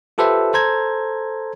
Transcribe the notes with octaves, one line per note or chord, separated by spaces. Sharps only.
F4 G4 A4 B4 C5 E5
A4 C5 A#5 G#6